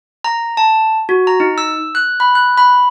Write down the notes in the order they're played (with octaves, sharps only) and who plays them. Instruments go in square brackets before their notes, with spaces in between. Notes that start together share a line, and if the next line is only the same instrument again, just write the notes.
[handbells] A#5
A5
F#4
A#5
D#4
E6
F#6
B5
F#6
B5